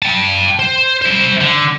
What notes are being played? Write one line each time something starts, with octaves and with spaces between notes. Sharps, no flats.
G5 A5
C5
E4 C5
D3